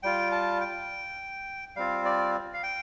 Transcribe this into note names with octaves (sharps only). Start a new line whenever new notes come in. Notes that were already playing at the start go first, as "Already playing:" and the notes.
G3 F4 G5
A5
G5
G3 C4 F4 F5
D5
F5
G5